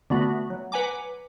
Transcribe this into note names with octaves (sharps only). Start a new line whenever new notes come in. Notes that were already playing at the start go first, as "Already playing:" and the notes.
D3 A3 B3 F#4
F#3
B4 F#5 G#5 A#5 D6